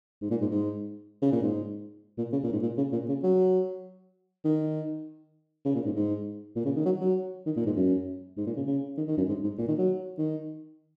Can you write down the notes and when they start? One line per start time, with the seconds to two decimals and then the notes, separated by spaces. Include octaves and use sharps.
0.21 G#2
0.30 A#2
0.41 G#2
0.51 G#2
1.22 C#3
1.32 A#2
1.42 G#2
2.18 A#2
2.32 C#3
2.43 A#2
2.52 G#2
2.62 A#2
2.78 C#3
2.92 A#2
3.08 C#3
3.23 F#3
4.44 D#3
5.65 C#3
5.75 A#2
5.85 G#2
5.96 G#2
6.55 A#2
6.65 C#3
6.76 D#3
6.85 F#3
7.01 F#3
7.46 D#3
7.57 A#2
7.66 G#2
7.76 F#2
8.37 G#2
8.46 A#2
8.57 C#3
8.67 C#3
8.97 D#3
9.08 D#3
9.17 F#2
9.28 G#2
9.43 G#2
9.58 A#2
9.68 D#3
9.78 F#3
10.18 D#3